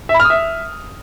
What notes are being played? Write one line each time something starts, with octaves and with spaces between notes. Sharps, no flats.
E5
B5
F6
D#6
E5